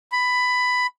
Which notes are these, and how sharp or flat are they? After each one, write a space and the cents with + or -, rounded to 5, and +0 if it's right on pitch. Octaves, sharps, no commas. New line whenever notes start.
B5 +10